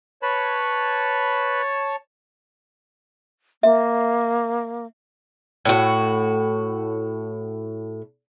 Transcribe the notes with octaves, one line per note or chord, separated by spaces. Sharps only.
B4 C#5 A5 B5
A#3 E5
A2 F#4